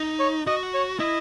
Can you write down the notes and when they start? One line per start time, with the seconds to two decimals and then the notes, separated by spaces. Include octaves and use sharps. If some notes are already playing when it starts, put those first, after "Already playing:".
Already playing: D#4
0.19 C#5
0.47 F#4 D#5
0.74 C#5
1.00 E4 D#5